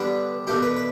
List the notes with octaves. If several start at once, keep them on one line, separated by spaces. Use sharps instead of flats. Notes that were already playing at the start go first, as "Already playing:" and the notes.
Already playing: D3 G3 B3 D4 B4
B2 A3 D4 G4
B4
B4